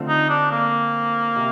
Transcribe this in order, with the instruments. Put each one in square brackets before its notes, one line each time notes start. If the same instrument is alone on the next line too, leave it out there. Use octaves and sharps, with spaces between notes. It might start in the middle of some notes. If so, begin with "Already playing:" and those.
Already playing: [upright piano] D3 A3 C4 F4
[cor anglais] D#4
D4
A#3
[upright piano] C3